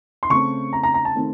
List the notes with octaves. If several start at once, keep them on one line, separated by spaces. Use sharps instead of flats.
C6
C#3 A3 C4 C#6
A#5
A#5
A#5
A5
D#3 A3 C4